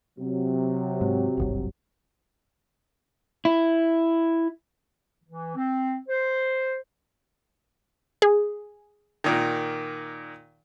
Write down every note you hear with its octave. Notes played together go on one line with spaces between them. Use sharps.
C3 F#3
G#2
D1 G#1 G2
E4
E3
C4
C5
G#4
A#2 D#3